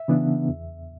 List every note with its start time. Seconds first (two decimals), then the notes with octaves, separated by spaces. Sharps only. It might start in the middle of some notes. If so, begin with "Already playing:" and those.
Already playing: E5
0.08 C#3 E3 B3 D4
0.49 E2